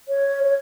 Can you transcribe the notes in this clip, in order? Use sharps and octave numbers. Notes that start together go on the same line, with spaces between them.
C#5
C#5